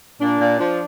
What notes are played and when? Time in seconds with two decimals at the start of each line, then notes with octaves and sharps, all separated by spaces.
0.20 A#2 D4
0.39 A#2
0.58 F3 D4